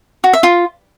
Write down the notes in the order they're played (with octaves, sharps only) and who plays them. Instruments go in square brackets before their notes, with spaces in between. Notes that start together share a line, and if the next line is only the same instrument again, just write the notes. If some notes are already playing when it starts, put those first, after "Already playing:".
[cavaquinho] F#4
E5
F4